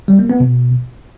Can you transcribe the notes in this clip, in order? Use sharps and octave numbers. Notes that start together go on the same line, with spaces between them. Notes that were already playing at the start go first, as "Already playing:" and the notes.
G3
A#3
B3
B2